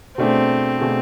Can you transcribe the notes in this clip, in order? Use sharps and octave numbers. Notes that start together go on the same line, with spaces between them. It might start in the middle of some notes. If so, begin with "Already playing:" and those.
B2 A3 C4 D4 G#4
B2 A3 D4 G#4